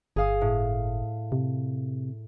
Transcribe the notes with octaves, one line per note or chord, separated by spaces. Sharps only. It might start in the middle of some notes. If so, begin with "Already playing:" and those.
G1 G#4 F5 D#6
A2
C3